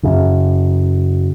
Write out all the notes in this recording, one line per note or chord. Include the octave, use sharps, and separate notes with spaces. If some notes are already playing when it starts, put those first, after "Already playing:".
F#2 C#3